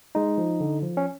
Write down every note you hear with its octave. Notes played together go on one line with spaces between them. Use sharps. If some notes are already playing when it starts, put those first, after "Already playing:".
G#3 D#4
F3
D3
F3
C#4